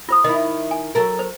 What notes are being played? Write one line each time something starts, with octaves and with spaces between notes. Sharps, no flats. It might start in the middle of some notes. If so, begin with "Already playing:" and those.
F4 C5 D#6
D#3 E4 D#5
G#5
F#3 A4 A#4
C5